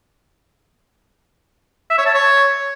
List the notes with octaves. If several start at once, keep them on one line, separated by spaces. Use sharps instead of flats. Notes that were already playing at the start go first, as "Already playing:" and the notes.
E5
C#5
A5
C#5